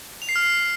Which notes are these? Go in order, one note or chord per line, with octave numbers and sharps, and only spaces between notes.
F7
C7
F6
C7